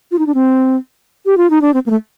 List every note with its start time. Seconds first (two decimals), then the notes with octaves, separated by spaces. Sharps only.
0.12 F4
0.19 D#4
0.27 D4
0.34 C4
1.26 G4
1.37 F4
1.50 D#4
1.61 D4
1.74 C4
1.86 A#3
1.90 A3